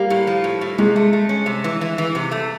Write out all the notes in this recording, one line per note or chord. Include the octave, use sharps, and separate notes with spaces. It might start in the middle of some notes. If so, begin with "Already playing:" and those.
Already playing: G3 A#3
A2
F3
A2
A2
C3 G#3
A3
A3
C#4
C3
E3
E3
E3
C3
A3